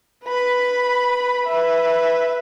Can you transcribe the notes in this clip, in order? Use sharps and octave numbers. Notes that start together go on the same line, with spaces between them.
B4 B5
B4 E5